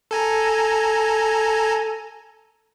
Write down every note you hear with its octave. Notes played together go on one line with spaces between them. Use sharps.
A4 G#5 A#5